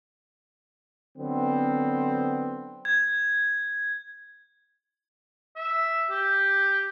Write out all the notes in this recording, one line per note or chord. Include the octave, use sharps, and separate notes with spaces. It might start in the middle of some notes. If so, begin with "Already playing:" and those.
D3 F#3 B3 C4
G#6
E5
G4